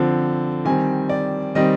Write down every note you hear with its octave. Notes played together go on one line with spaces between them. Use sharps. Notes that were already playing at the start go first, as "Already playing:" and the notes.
Already playing: D3 F3 C4
D#3 G3 C4 G#5
D5
D#3 G3 C4 D#5